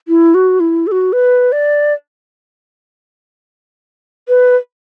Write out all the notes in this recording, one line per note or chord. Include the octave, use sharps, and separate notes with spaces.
E4
F#4
E4
A4
F#4
B4
D5
B4